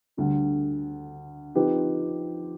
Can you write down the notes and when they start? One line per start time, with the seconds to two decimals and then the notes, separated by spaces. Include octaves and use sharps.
0.17 D2 D3 G3
1.55 F3 C4 D#4 G4 B4